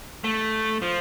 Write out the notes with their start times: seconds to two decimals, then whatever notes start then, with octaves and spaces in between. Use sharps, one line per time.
0.24 A3
0.82 F3